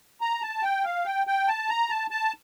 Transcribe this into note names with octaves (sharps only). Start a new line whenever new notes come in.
A#5
A5
G5
F5
G5
G5
A5
A#5
A5
A5